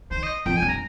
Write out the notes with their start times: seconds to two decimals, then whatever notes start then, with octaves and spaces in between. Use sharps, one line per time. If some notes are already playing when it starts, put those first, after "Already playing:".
0.11 D#3 C5
0.23 D#5
0.46 F2 G5
0.57 G#5
0.62 G2
0.69 A#5